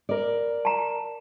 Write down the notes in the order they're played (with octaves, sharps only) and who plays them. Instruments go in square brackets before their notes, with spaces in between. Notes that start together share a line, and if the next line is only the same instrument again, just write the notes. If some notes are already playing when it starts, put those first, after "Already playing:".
[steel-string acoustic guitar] A#4 D5
[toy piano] A5 A#5